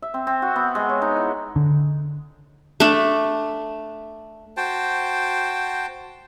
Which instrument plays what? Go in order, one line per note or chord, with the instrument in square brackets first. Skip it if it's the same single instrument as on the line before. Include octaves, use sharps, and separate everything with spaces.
[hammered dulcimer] E5
C4
C4
F#4
B3
G#3
C#5
D#4
E4
[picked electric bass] D3
[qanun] A3 D4
[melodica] F#4 C5 G5 A5